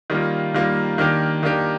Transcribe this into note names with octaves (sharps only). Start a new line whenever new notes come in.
D#3 G3 A#3 F4
D#3 G3 A#3 F4
D#3 A#3 D4 G4
D#3 A#3 D4 G4